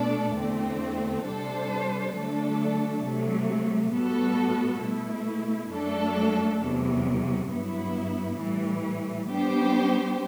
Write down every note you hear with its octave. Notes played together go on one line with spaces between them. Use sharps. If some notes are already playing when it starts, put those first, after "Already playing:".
Already playing: B2 A3 D4 A4 D5
E2 D3 A3 C4
C3 G3 D4 A4 C5
D3 F#3 A3 D4 A4
C3 F#3 A3
A2 G3 B3 F#4 A4
B2 A3 E4
F#2 F#3 A3 D4 A4
E2 C3 F#3
G2 F#3 B3 E4
A2 E3 G3
G3 B3 D4 G4 C5